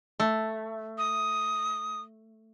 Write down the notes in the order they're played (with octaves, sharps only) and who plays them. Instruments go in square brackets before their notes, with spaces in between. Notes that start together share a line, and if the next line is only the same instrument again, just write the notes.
[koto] A3
[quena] D#6